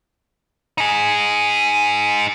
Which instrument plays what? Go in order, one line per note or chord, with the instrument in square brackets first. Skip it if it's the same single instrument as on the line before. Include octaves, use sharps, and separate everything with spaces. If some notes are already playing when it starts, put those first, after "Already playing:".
[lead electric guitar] D#4 G#4